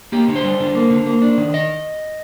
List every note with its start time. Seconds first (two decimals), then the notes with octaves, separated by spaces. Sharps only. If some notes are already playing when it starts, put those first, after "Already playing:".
0.12 A#3 G4
0.28 D3
0.35 C5
0.43 G3
0.60 D3
0.75 A#3
0.90 D3
1.06 A#3
1.22 D4
1.37 D#3
1.54 D#5